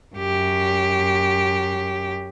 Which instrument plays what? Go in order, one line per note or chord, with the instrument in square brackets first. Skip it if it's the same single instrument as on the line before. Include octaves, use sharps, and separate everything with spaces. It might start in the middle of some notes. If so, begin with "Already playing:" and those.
[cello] F#2 G4